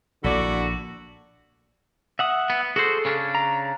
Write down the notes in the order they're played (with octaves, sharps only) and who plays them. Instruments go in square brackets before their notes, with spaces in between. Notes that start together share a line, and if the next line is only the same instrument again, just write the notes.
[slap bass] A#1 A#2 [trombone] D3 [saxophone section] E4 A4 D5 [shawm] F#4
[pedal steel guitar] E5 F#5 D#6
[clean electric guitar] B3
[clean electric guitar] F#4 C5 [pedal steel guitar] G#4 A4
[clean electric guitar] C#3 C#4 D4
[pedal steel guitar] A#5